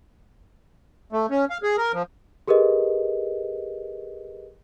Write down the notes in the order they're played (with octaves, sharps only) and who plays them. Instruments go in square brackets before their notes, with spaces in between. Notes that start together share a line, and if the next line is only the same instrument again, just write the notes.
[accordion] A3
C#4
F5
G#4
A#4
F3
[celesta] G4 G#4 A#4 B4 D#5